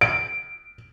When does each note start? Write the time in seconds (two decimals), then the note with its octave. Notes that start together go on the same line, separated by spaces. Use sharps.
0.01 D7